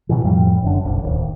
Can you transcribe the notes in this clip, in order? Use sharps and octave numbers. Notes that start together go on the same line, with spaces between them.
B2 D#3 E3
F2 A2 F3 G3
F#1 F#2 D3
F#1 B1
D1 D#2